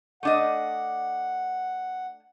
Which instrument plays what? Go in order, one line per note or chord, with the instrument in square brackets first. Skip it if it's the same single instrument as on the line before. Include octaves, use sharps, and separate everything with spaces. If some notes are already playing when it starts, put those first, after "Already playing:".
[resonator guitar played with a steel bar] A3 D4 D#5 [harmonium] F#5